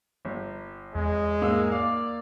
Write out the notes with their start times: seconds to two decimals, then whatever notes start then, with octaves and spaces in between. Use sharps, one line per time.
0.25 G1
0.95 E2 G#3 C4
1.42 G#2 A#3 E6
1.71 A#3 D5 F5